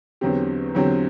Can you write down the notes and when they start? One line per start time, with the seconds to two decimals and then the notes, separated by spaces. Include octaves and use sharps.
0.21 E2 D3 F#3 C4 G4
0.75 E2 D3 F#3 C4 G4